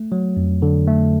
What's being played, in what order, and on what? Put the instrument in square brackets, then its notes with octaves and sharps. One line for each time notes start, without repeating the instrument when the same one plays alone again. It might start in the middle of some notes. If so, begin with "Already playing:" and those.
Already playing: [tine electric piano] A3
F#3
F2
D3
A3